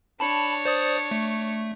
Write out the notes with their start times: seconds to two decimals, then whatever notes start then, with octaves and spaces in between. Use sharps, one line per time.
0.20 D4 C#5 A5 B5
0.65 C5 D5 D#6
1.11 A3